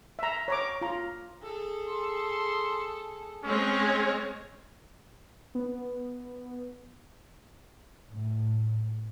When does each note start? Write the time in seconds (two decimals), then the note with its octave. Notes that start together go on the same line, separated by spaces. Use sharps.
0.19 E5 A#5
0.48 C#5 A#5 D6
0.81 F4 A#5
1.43 G#4 A4
1.89 C6
3.44 G#3 C4 C#4 C#5 D#5 F6
5.55 B3
8.11 A2